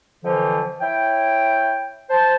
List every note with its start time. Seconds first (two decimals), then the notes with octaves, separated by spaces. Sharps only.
0.24 F2 D3 E3 F3
0.81 E4 C#5 G5
2.10 C5 A5